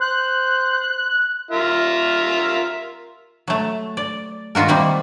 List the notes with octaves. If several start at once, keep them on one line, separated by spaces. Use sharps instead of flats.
C5 F#6
F4 A#4 E5
F#3 A3
D5
A#2 D#3 F4 F#4 A#4
C3 D#3 G3 A#3 C4